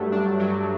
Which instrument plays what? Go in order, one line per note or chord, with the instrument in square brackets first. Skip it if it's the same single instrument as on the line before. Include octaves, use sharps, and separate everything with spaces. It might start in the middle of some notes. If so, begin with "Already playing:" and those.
Already playing: [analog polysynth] G2 F#3 A3 [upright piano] G3
[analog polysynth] D4
F#3